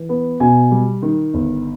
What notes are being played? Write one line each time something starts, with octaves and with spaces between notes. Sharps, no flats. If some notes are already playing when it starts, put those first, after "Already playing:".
Already playing: E3
B3
B2 G#5
G3
D#3
G1